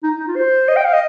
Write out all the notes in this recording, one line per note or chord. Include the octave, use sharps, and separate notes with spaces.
D#4
D#4
F4
C5
D#5
G5
F5
D#5